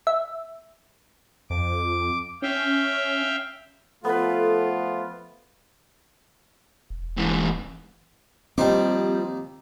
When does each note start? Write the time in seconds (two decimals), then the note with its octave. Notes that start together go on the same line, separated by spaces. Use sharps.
0.07 E5
1.50 F2 D6
2.42 C#4 E5 F5 G5
4.05 F3 A3 B3 F4 A4 B4
6.90 E1
7.18 G#2 E3
8.58 D#2 F3 G3 C4 D#4 D6